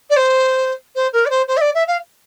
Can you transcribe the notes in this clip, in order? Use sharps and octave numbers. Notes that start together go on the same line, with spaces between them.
D5
C5
C5
A#4
D5
C5
C5
E5
D5
E5
F5